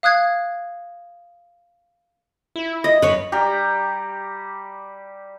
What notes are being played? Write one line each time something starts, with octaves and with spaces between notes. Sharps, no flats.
F5 D#6 F#6 G#6 C7
E4
D#5
F#2 B4 C#5
G3 G4 A#5